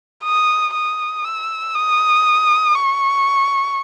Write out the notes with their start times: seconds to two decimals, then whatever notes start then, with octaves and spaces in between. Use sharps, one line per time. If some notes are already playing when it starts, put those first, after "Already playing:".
0.24 D#6
0.74 D#6
1.25 E6
1.74 D#6
2.75 C#6